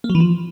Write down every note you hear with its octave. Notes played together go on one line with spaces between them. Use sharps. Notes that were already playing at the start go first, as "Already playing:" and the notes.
A#3
F#3
E3
F3